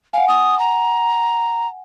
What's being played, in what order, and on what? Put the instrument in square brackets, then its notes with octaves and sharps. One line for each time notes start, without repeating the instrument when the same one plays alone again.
[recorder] F5 [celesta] F#5 G#5
[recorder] D#6
A#5